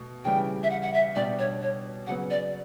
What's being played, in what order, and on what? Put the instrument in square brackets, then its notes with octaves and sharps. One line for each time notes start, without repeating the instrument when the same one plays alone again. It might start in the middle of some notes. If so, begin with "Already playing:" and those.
Already playing: [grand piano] B2 A3
[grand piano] C#3 E3 G3 [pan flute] G5
[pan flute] E5
F#5
F#5
E5
[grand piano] B2 G3 D4 G4 [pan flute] D5
[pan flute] C#5
C#5
[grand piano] C#3 F#3 B3 [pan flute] F#5
[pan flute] D5